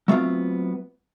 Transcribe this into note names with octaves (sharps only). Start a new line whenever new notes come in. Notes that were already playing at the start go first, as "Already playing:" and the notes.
F#3 A3 B3 C4 F4